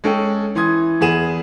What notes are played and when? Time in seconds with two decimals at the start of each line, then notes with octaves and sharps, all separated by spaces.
0.04 G#3 C#4 A4 G5
0.55 E3 C6 D#6 G#6
1.01 E2 B3 G#4 D#7 E7